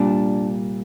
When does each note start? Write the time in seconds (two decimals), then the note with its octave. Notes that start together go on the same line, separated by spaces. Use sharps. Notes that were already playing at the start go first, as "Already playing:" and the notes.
Already playing: C2 A#2 G3 D4